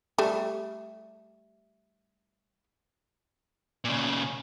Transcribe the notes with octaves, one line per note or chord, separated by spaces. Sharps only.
G3 A3
A#2 C#3